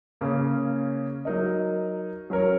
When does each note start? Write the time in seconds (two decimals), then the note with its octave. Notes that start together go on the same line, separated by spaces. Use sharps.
0.21 C#3 A#3 C#4 G#4 C#5
1.25 F#3 D#4 A#4 D#5
2.30 F#3 C#4 A#4 C#5